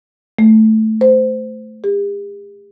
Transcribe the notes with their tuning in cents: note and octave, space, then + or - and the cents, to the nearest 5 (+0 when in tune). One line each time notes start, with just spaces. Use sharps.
A3 -5
C5 -20
G4 +45